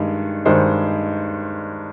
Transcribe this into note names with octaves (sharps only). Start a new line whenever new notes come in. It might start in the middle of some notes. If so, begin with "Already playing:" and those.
Already playing: G2 D#3 G#3
G2 D#3 G#3 C5